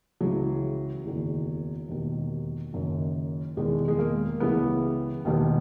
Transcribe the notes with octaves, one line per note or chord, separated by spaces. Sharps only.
C#2 C#3 E3 F#3
F#1 E2 D#3
E1 D#2 D#3
F#1 F#2 D#3
E1 E2 D#3 G#3
G#3
A#3
C#2 C#3 E3 B3
E1 D#2 D#3